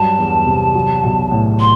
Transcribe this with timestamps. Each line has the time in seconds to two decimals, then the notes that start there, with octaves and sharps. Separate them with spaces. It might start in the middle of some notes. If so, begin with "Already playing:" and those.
Already playing: G2 F#3 A5
0.18 E2
0.46 C3
0.75 F#3
1.03 B1
1.31 A2
1.60 C6